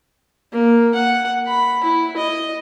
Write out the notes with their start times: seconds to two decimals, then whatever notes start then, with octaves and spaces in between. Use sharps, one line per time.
0.52 A#3
0.94 F#5
1.47 B5
1.84 E4
2.17 D#5